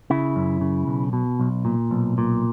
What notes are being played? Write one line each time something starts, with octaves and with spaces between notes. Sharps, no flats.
C#3 E4
F#2
C#3
B1
B2
B1
A#2
B1
A#2